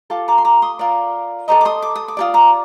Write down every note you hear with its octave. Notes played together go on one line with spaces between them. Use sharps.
F4 A4 D6
A#5 D6
C6
A#5 D6
C6 D#6
F4 A#4 D5
A4 C5 D#5 A#5 D6
D6
C6 D#6
D6
D#6
D6
F4 A4 D5 D#6
A#5 D6